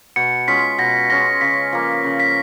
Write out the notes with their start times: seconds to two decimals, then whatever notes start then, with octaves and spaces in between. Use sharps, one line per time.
0.16 B2 C#7
0.48 G#3 C#4 F4 B6
0.78 B2 A#6
1.10 G#3 C#4 F4 A#6
1.41 C#3 B6
1.73 F3 A#3
2.04 C#3
2.20 B6